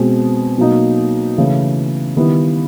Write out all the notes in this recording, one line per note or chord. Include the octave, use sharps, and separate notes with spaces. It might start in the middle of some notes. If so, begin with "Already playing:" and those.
Already playing: B2 G#3 C4
B2 F#3 A#3 D#4
C#3 E3 A3
D#3 G3 B3 E4